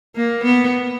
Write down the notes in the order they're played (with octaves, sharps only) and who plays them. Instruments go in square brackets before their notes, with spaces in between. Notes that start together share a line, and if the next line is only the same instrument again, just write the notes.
[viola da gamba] A#3
B3